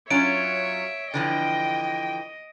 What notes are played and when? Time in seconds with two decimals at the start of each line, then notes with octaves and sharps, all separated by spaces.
0.11 F#3 C#4 F4 C#5 E5 D7
1.14 D3 E3 F3 D#5 G5